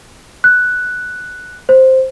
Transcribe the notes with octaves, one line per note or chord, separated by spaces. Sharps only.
F#6
C5